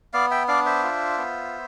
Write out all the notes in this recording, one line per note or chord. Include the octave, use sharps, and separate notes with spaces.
B3 D5 F5
E5 G5
D4 D5 F5
C5 E5
F4
B3